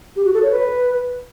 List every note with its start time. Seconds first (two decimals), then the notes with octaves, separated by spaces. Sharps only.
0.16 G4
0.25 F#4
0.34 A4
0.43 C#5
0.51 B4